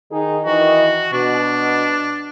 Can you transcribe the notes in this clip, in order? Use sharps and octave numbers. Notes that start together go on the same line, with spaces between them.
D#3 D#4 G#4
D#3 E3 F#4 D#5
B2 D4